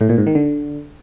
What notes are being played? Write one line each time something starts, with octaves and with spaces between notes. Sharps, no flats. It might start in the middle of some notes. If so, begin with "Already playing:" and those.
A2
A#2
G#2
D#3
D3